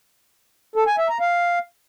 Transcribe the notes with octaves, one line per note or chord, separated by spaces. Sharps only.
A4
G#5
E5
A#5
F5